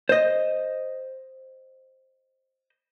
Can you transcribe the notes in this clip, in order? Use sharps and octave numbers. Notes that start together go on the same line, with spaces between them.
C5 D#5